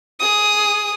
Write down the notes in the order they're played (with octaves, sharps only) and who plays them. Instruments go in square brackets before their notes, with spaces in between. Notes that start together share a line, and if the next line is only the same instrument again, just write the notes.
[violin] G#4 D#6